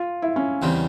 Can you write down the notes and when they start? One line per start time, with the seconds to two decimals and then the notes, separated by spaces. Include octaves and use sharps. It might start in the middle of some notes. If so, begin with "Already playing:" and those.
Already playing: F4
0.22 E4
0.36 C#4
0.62 E2 C#3 G3 C4